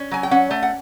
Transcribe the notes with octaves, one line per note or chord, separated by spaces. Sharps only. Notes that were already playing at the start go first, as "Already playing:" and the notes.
Already playing: C#4
F#3 G#5
G5
C#4 F#5
A3
F#5